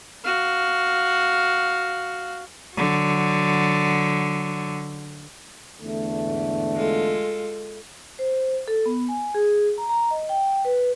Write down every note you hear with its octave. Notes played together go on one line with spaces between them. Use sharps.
F#4 F5
D3 F#3
E2 D3 A3
G#2
G#3 F4 A4
C5
A4
B3
G#5
G#4
A#5
A#5
D#5
G5
B4